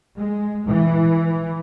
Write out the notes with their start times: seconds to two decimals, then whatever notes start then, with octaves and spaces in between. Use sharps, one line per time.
0.17 G#3
0.67 E3